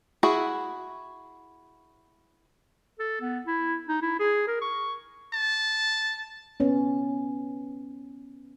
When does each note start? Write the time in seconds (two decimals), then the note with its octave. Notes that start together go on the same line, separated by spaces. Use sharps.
0.23 E4 F#4 G#4
2.99 A4
3.21 B3
3.46 E4
3.88 D#4
4.02 E4
4.19 G#4
4.47 A#4
4.61 C#6
5.34 A5
6.60 B3 C#4